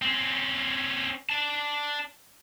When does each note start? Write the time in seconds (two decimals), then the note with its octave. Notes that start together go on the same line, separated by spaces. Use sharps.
0.02 C4 C#4
1.29 D5 A5